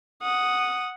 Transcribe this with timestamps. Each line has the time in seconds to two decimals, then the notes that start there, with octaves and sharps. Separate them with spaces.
0.22 F#5 D#6